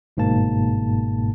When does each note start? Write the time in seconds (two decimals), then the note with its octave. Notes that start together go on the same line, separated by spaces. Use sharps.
0.17 G1 G#2 B2 A#3 A5